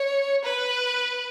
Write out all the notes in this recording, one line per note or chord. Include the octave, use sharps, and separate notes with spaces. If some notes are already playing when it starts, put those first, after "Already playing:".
Already playing: C#5
B4